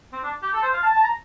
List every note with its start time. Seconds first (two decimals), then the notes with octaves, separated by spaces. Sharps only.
0.12 C4
0.23 D4
0.43 G4
0.53 A4
0.62 C5
0.74 F5
0.83 A5
0.93 A5
1.03 A#5